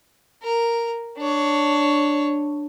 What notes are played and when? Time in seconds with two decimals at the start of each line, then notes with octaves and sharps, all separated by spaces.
0.43 A#4
1.18 D4 C#5